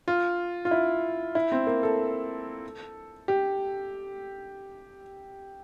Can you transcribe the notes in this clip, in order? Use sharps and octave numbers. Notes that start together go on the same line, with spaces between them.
F4
F4
E4
E4
C4
A#3
A4
G4